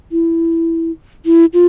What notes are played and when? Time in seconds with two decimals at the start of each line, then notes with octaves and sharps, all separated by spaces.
0.11 E4
1.26 E4
1.53 F4